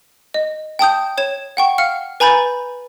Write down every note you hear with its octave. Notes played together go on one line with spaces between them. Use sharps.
D#5
G5 A5 D#6 G6
C#5 G#6 E7
F#5 G5 C#6
F5 F6 C#7
B4 G#5 A#5 B5 G6 A6